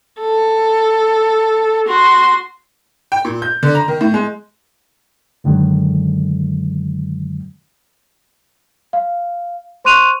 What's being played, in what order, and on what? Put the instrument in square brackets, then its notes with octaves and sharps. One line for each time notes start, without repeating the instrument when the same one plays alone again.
[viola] A4
F#4 C6
[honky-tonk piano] G5
A#2
G6
D3
A#5
D#3
A2
G#3
[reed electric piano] F#2 D3 D#3 F#3 G#3
[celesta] F5
C5 C6 C#6 F#6 D#7 F7